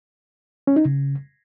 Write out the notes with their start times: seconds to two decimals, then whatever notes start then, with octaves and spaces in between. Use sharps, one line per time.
0.67 C#4
0.76 D#4
0.85 C#3